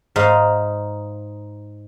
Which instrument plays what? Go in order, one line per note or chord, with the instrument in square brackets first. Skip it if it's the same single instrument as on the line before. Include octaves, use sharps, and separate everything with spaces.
[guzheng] G#2 D#4 F5